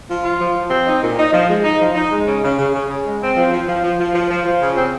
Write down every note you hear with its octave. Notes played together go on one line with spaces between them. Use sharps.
F3
F4
F3
F3
C4
D#4
A#2
D#4
F3
G#3
D#4
F3
D#4
G#3
C#3
C#3
C#3
C#3
C#3
G#3
C4
F3
F3
F3
F3
F3
F3
F3
F3
C#3
C4